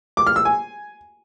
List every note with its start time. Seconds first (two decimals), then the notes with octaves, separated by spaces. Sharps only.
0.17 D6
0.27 F6
0.36 E6
0.45 G#5